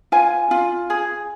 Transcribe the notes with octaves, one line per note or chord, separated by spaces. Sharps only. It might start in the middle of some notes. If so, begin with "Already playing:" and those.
F4 G#5
F4
G#4